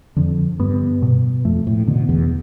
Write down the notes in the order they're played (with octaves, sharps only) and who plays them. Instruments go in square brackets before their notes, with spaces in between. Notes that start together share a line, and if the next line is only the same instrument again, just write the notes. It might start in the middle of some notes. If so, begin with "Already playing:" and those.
[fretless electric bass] F2 [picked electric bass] D3
[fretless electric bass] G2 [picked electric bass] B3
[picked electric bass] B2
[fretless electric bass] F2 [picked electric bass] A3
[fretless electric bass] A2
[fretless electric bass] B2 [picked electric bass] D3
[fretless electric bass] E2